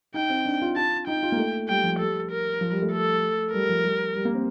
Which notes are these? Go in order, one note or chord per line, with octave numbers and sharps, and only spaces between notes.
D#4 G5
C4
D4
F4
F4 A5
D#4 G5
F4
A#3
A3
G3 G5
F3
G3 A4
A#4
F3
G3
A3
A4
G3 A#4
F3
G3
G3
A#3
C4